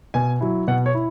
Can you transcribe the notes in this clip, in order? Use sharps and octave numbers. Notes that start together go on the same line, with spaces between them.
B2 G#5
F#3 E4
B2 F#5
C#5
E4